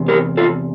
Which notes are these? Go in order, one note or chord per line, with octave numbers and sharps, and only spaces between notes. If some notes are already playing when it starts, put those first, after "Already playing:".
Already playing: E2 C3
G4 A#4
F4 A4